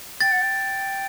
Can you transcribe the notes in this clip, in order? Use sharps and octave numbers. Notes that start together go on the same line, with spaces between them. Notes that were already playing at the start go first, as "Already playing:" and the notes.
G5 A6
F#5
G5